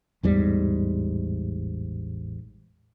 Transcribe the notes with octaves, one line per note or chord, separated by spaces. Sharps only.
A1 E2 G#2 G3